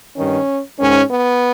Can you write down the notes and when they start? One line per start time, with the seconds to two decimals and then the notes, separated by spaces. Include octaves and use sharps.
0.16 G2 D#3 C#4
0.79 G#2 D#3 C#4
1.10 B3